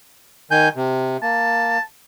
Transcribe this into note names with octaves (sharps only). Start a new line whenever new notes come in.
D#3 G#5 G6
C3
A#3 A5